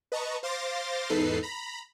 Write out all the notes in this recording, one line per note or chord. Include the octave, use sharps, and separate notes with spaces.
B4 D#5 A5 A#5 C#6
C5 F5 C6 D6 A6 A#6
E2 G#2 D#4 A4 B4 C7
A#5 B5